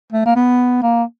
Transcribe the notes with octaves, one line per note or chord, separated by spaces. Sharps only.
A3
A#3
B3
A#3